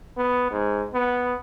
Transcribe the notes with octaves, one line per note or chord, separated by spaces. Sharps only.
B3
G#2
B3